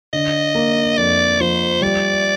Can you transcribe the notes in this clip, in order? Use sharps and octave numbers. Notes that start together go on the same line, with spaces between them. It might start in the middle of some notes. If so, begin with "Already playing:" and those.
D3 D#5
A#3
F2 D5
F3 C5
G3 D5